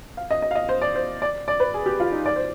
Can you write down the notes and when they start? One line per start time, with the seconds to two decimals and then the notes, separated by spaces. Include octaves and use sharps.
0.17 F5
0.31 D#5
0.42 D#5
0.51 F5
0.55 D#5
0.69 C5
0.82 D5
0.96 C5
1.22 D5
1.48 D5
1.60 B4
1.74 G#4
1.86 G4
2.00 F4
2.12 D#4
2.26 D5
2.36 C5